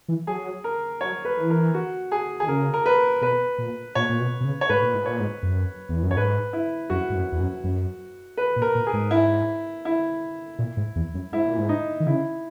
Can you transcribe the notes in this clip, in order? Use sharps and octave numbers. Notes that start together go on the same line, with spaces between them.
E3
F#3 G#4
A#4
F#3 C#5
B4
E3
A#4
F#4
G#4
D#3 G#4
C#3 A#4
A#4
B4
B2 B4
A#2
A#2 C#5
A#2
B2
B2
C#3
C#5
G#2 B4
A#2
G#2
A#2 C#5
G#2
F#2
E2
F#2
C#5
G#2 B4
E4
F#2 F#4
G#2
F#2
E2
F#2
F#2
B4
A#2
A#4
A#2
G#4
G#2
E4
E4
A#2
G#2
E2
F#2
G#2 E4
A#2
G#2
D#4
D#3
C#3 E4